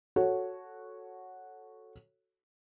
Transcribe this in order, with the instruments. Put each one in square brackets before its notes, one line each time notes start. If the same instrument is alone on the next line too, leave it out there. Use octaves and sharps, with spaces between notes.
[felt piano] F#4 A4 C#5